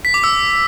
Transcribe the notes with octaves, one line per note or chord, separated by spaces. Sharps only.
B6
D6
E6